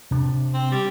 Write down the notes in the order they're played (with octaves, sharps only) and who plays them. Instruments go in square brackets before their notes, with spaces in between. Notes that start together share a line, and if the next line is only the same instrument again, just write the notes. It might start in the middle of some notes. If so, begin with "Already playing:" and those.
[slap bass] C3 D4
[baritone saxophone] C4
G3